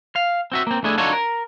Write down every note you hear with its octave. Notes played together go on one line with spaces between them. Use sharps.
F5
C4 F#4 E5
A#3 C4
A3 D4 E4 G#4
D4 D#4 F4 F#4 A4 C#5
A#4